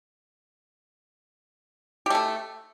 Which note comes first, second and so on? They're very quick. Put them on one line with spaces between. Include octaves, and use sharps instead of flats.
G4 A3 A4